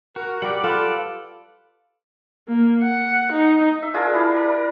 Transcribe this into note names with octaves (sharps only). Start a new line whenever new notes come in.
F#4 A#4
G3 G4 D5 F#5
F4 A4 B4
A#3
F#5
D#4
E5
D4 F4 G#4 A#4
G3 D4 E4
A#4